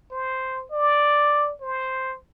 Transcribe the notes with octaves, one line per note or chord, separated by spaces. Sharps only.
C5
D5
C5